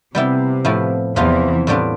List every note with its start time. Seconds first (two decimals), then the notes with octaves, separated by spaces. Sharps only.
0.14 C3 G3 B3 E4 G4
0.65 A2 F3 B3 E4
1.16 E2 C3 E3 F3 B3 F4
1.67 A2 G3 B3 D4 F4